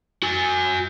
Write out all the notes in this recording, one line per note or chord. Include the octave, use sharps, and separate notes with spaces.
F#4 G#5